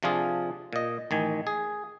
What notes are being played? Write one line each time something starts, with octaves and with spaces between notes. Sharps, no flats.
C3 F3 D4 F4 G#4
A#2 D#5
A1 D#3 G#5
G#4